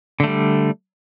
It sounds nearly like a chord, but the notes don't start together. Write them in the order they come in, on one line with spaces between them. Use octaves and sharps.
D3 A3 G3